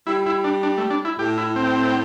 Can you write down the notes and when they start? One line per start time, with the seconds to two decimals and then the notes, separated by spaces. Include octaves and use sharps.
0.07 G3 E4
0.26 E4
0.44 D4
0.63 D4
0.78 A3
0.90 D4
1.05 E4
1.19 A2 G4
1.38 E4
1.56 C4